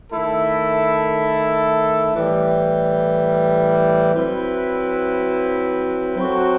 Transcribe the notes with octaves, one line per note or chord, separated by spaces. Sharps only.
D#3 A3 E4 A4
A2 E3 G3
F#3 C4 E4 B4
F#3 C4 F#4 A4